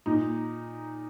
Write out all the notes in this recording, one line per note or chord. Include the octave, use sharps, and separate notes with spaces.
A#2 D#4